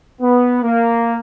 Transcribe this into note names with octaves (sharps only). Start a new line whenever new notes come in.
B3
A#3